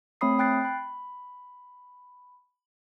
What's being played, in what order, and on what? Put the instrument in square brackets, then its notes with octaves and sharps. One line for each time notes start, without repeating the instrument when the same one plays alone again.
[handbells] A3 C4 C#5 B5 D#6 C7
G5 F#6 A6 C7
B5